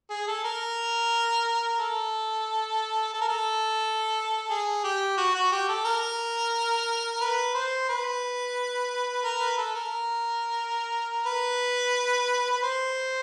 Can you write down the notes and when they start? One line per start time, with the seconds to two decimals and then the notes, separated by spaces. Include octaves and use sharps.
0.10 G#4
0.27 A4
0.44 A#4
1.79 A4
3.14 A4
3.21 A#4
3.28 A4
4.50 G#4
4.84 G4
5.17 F#4
5.34 F#4
5.52 G4
5.68 A4
5.85 A#4
7.21 B4
7.55 C5
7.89 B4
9.24 A#4
9.40 B4
9.58 A4
9.75 A#4
11.26 B4
12.51 B4
12.62 C5